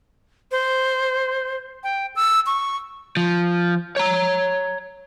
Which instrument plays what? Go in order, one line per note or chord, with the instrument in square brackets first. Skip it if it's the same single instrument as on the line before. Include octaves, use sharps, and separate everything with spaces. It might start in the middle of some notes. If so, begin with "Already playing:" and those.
[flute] C5
G5
E6
C#6
[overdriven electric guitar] F3
C#5 A#5